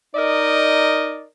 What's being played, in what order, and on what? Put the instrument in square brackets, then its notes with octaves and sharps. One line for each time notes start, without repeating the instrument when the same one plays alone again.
[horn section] D#4 A#4 D5 D#5